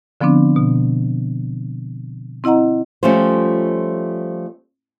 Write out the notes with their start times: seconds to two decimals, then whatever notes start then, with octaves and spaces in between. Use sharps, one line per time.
0.21 D3 F3 B3 C4 D4
0.56 B2
2.44 C4 E4 D#5 F#5 A#5
3.03 F3 G3 A3 C#4 F4 C5